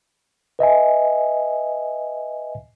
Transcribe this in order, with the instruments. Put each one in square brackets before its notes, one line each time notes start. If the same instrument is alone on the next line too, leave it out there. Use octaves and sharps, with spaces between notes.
[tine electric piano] B4 D#5 E5 G#5